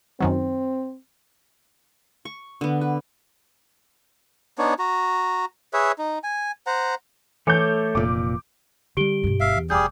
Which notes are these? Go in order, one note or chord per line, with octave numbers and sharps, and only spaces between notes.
F#2 D#3 F#3 C4
C#6
D3 B3
B4
B3 D4 D#4 C#5
F#4 A#5
G#4 B4 C#5 E5
D#4
G#5
C5 F#5 A#5
E3 A3 A4 C#5 D6 G6
F1 A#2 D6
D3 G3 C4 G4 D7 G7
G2 B2
G1 E5 F5
E2
F1 G3 G#4 D6 D#6 G6